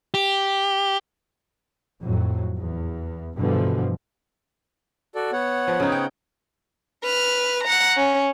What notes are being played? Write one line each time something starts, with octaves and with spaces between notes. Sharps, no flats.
G4
F2 A2 F#3
E2
G2 B2 D3 E3 F3
F#4 A4 D5
B3 C#5 F#5
F3
C#3 D#4
G5
B4 F6
F#5 A#5
C#4